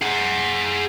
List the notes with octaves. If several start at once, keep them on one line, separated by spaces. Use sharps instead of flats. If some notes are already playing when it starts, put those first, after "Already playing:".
G#4 F#5